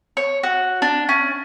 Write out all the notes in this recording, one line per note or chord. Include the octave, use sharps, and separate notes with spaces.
C#5
F#4
D4
C#4